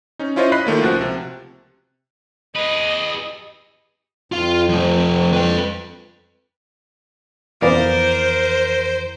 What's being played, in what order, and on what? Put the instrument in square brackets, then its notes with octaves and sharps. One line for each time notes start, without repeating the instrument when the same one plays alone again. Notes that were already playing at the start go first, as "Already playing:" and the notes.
[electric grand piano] C#4 D#4
C#4 E4 F4 C5 C#5 D#5
D#5 B5 F#6 B6 C7
D#3 A3 A#3 F4
C#2 F3 F#4 F#6
C3
[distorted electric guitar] G#4 B4 [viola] D#5
[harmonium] F2 [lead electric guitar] F4 F5
[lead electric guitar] F3 A3
B4 G5
[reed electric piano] F2 E3 [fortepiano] B3 D5 F5 [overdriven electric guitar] A#4 [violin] C5